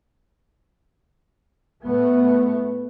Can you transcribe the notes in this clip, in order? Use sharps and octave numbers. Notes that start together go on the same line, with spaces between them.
A2 A3 B3